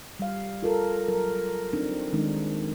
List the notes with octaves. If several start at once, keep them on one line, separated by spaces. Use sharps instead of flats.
G3 F5
F4 A4 A#4
F#3 A#4
C4 D4 D#4
D#3 G#3 C4 D4 D#4